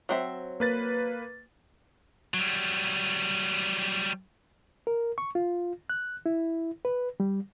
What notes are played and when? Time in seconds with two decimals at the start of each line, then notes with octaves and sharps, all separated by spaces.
0.09 F#3 C4 E5
0.60 A#3 B4 A6
2.34 F#3 G3
4.87 A#4
5.18 C#6
5.35 F4
5.90 F#6
6.26 E4
6.85 B4
7.20 G3